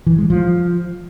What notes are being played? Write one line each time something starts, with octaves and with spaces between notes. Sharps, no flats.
E3
G#3
F3